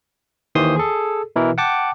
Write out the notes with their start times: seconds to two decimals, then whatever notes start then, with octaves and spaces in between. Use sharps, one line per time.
0.55 D#2 D#3 E3 C5 C6 D#6
0.76 G#4 A4
1.36 B2 E3 E4 A#4
1.58 F#5 G5 A5 D6